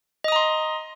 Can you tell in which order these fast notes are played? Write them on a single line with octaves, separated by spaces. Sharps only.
D#5 D#6 A#5 C6